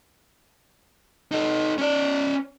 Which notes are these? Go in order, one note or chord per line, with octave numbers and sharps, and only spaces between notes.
D#4 A4
C#4 D5